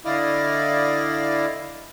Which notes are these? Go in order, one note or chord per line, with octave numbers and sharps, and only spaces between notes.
D3 E4 D5 D#5 F5